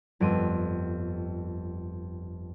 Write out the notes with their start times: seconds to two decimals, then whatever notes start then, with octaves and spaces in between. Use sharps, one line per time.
0.20 G1 F2 D7 D#7